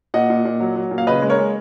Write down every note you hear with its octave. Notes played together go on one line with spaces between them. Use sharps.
A#2 D#5 F#5
A#2
A#2
F#3
F#3
A#2
F5
C#3 B4 D#5
G#3
A#4 C#5
G#3